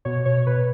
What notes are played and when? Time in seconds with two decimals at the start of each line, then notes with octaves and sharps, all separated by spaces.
0.05 B2 C#5
0.25 B2 C#5
0.47 B2 B4